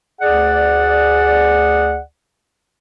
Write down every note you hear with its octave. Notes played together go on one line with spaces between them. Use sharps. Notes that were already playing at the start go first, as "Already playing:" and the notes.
D2 G#4 D5 F#5